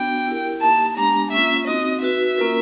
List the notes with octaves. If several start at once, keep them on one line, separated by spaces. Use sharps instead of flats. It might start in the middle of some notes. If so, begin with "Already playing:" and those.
Already playing: B3 D4 F#4 G5
E4 G4 A#4
A#3 D#4 G4 A5
G#3 B3 D4 G4 A#5
A#3 C#4 F4 E5
C4 D#4 F#4 D#5
D#4 F#4 B4 E5
A#3 C#4 F4 A#4